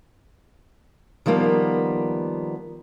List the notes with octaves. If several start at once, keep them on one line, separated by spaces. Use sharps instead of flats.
D#3 F3 G3 A#3 B3